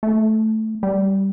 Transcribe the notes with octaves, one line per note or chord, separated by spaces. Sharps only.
A3
G3